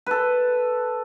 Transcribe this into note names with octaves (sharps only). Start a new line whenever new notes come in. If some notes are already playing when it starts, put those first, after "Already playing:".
A4 B4